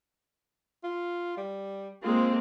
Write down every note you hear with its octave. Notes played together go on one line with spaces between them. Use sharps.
F4
G3
G#3 A#3 C4 F4